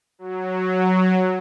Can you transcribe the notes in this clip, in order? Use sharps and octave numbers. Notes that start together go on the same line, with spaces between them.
F#3